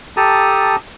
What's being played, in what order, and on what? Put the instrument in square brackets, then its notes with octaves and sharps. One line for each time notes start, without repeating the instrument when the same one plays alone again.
[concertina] G4 A4 A5 A#5 D#6